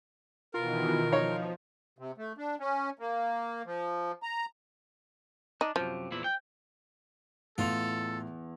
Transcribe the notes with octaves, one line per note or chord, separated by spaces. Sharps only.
B2 D#3 E3 F4 A#4
F3 D#4 C#5 D#5
C3
A3
D4
C#4
A#3
F3
A#5
D4 D#4
F#2 C3 F3
E2 A#2 E4
G5
E2 A2 F4 A4 F7